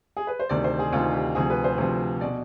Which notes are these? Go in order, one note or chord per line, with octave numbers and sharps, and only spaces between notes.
G#4
B4
C5
D2 C3 D#3 D5
C5
G#4
D2 C3 D#3 F4
G4
D2 C3 F3 G#4
B4
C5
D2 C3 F3
B2 D5